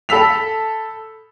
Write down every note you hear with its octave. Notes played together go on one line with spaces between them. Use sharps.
A4 B5 E6 B6 F7